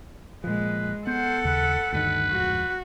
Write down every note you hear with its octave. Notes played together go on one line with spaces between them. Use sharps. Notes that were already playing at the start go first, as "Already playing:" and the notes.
A#2 F3 G#3 B4
B3 A4 C5 F#5
D#2 C#3 B4
D2 G2 D#3 B4
D1 F2 G#2 F#4